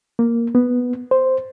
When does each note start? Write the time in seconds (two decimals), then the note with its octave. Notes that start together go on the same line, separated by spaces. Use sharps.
0.19 A#3
0.55 B3
1.11 C5